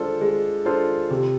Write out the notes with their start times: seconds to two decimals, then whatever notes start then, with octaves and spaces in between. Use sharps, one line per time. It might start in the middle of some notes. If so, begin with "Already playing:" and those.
Already playing: G#3 D4 F4 A4 C5
0.21 G#3
0.65 D4 F4 A4 C5
1.10 C3